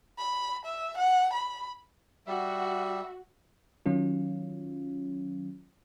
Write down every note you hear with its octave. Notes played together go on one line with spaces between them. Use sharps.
B5
E5
F#5
B5
G3 F#4 E5
D#3 F#3 C#4 F4